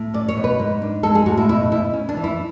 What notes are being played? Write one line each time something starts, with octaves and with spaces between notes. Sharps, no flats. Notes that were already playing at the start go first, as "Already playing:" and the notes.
Already playing: A2
C#4 D5
C#5
B2
B4
G#2
D4
G#3 A4
G#4
A2 F#4
E4
B2 E4
B2 E4
C#4
D4
E3
E4